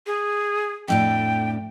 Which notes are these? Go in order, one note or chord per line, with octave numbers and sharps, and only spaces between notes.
G#4
F2 A2 D4 G5